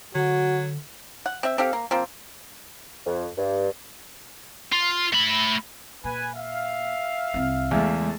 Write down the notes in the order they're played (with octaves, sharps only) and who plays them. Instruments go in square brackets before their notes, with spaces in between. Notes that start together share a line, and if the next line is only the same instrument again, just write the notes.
[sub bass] D3 [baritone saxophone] F#3 [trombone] F#4
[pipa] F#5
C4 E5
C4 G4 A4 F5
A#3
F3 A#3 C4
[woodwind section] F2
G2
[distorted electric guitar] F4
A3 B5
[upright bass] A#2 [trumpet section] B4 G#5
[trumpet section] E5 F5
[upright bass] C2 C4
[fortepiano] E2 [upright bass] C#3 [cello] G#3 A3